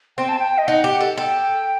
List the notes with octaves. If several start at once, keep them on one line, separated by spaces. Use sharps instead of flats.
C4 G5
A5
G5
D#5
D#4 F#5
G4
F#5
A4
A4 G5